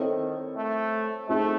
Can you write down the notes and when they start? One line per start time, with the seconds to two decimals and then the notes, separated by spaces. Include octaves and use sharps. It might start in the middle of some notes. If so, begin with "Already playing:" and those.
Already playing: D#3 C4 E4 A4 C#5
0.57 A3
1.29 A3 C4 D#4 G#4